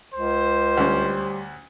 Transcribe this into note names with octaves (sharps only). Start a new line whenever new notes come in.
C#2 C5
D2 G3 C#4